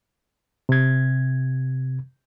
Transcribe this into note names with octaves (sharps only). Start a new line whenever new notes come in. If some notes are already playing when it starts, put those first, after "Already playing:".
C3 G#6